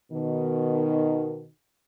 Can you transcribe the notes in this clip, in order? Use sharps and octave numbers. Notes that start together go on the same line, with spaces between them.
B2 D#3